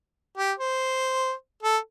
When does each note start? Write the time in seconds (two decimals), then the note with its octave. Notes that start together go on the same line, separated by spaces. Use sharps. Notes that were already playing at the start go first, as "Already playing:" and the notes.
0.37 G4
0.59 C5
1.63 A4